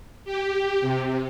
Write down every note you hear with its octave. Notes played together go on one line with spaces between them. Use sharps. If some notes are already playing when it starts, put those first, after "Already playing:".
G4
C3